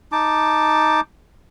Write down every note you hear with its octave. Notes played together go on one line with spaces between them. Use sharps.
D#4 A5 D6